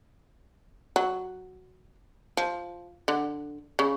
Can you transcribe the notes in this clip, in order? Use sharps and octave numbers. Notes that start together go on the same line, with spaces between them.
F#3
F3
D3
C#3